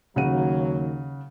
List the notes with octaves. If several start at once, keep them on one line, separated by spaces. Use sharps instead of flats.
D#2 C#3 F#3 F#5 D#7